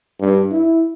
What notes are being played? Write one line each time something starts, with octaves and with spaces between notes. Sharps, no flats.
G2
E4